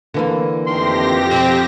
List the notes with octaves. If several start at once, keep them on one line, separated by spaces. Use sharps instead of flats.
D3 E3 A#3
F2 D#3 A3 G4 C6 A#6
B2 C4